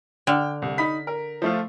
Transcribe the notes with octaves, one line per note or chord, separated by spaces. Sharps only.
D3 G5 F6
C2
D#4 B5 B6
A#4
F3 A3 F4